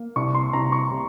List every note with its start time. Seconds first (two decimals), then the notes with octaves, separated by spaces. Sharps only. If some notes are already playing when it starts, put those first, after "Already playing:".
Already playing: A#3
0.16 C2 C#6
0.34 C6
0.53 C2 A#5
0.72 C#6
0.91 C3